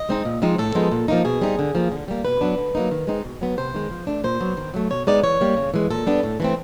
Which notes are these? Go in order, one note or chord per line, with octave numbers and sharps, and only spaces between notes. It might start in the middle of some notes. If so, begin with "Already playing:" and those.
Already playing: D#5
G#3 C4 D#4
A#2
F3 G#3 C4 D#4
A2 A4
F3 G#3 B3 D#4
A#2
F3 A#3 D#4
B2 G#4
G3 C4 D#4
D3
F3 A#3
D3
G3 A#3
B2 B4
F#3 B3 D4
D3
F#3 A#3 D#4
D#3
G#3 C4 D#4
B2
F#3 B3
C3 C5
D#3 G#3
F3
A3 D4
A#2 C5
F#3 B3
D#3
F#3 A3
B2 C#5
G#3 B3 D#4 D5
E3 C#5
G3 A#3
C#3
E3 G#3
A#2 A4
G3 B3 D4
A2
E3 A3 C4